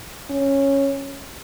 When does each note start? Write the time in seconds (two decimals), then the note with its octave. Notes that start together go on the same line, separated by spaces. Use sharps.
0.30 C#4